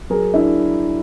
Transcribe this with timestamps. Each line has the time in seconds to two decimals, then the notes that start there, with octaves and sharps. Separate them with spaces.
0.10 F#3 G#4 A#4
0.34 D4 E4